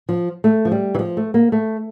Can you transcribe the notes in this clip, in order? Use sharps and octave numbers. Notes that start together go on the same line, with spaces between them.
F3
A3
F3
G3
E3
F3
A3
A#3
A3